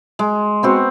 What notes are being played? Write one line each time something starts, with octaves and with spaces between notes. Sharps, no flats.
G#3
B3 C4 F#4